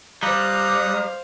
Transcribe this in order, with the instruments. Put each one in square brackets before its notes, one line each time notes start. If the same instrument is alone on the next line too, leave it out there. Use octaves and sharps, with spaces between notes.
[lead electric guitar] G3 [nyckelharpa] C5 F5 [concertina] A#5 D#6 F#6